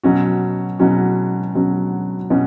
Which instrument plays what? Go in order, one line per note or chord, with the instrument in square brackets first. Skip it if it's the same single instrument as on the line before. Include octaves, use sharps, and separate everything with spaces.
[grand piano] B2 F#3 C#4 F#4
B2 F#3 C#4 F#4
B2 F#3 C#4 F#4
B2 F#3 C#4 F#4